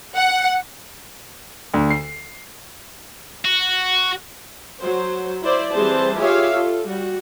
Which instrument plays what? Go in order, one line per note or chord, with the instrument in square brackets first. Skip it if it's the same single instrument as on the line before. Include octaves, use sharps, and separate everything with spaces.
[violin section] F#5
[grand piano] D2
C7
[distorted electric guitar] F#4
[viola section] F#3 C5
E4 C5 D5
E3 G3 C4 G#4 C5 A5
F4 G4 G#4 C#5 E5 F5
F4 A4
G3 F#4